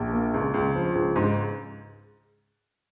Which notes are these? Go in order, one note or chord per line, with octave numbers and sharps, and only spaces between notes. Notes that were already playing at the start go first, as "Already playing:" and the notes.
Already playing: A#1
A#3
C#2
C#2
F3
C#2
G#2